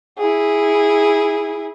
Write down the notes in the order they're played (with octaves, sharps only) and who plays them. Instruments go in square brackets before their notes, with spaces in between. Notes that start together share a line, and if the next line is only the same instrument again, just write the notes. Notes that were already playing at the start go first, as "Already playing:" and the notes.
[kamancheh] E4 G#4